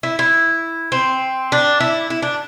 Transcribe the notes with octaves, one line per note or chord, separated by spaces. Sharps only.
E4
E4
C4
D4
E4
E4
D4